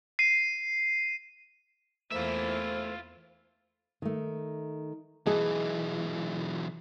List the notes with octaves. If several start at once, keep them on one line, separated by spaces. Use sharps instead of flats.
C7 D#7
E2 A3 A#3 E4 F4 C5 E5
D#3 A3
B1 E3 G#4 D#5 A5